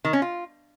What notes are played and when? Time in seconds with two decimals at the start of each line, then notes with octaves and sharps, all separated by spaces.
0.05 D#3
0.13 C#4
0.22 F4